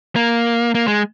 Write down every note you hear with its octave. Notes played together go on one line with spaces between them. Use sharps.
A#3
A#3
G#3